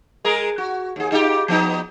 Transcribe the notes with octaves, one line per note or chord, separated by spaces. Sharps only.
G#3 G#4 A#4
F#4
D#2 G#4
D#4 F4 G4
F3 B3 D#4